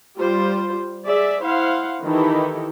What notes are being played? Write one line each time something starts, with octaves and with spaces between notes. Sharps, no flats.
G3 F4 C5
G#4 D5 E5
E4 C5 F5 F#5
D#3 E3 D#4 E4 G4 A4